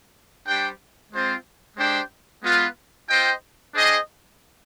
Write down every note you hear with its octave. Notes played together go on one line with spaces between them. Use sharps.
G3 D4 G4 C5 G5
G#3 C4 F4 C5
G#3 D4 G4 C5 G5
G#3 B3 F4 B4 F5
C4 F4 C5 D#5 G5
D4 G#4 C5 D#5 G5